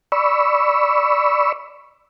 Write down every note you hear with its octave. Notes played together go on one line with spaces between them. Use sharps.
D5 B5 C#6 E6